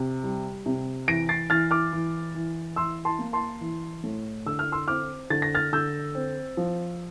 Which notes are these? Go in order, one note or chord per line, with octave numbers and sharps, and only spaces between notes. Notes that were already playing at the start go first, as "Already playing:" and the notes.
Already playing: C3
G3
C3
E3 A#6 D7
A6 C7
E3 F6 A6
D6 F6
E3
E3
E3 C6 E6
A5 C6
A#3
A5 C6
E3
A2
D3 E6
F6
C6 E6
C4 D6 F6
D3 A6
A#6
F6 A6
D3 E6 G6
C4
F3